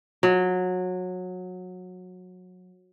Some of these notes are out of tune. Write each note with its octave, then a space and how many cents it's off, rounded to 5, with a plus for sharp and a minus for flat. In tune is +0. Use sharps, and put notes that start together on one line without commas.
F#3 -20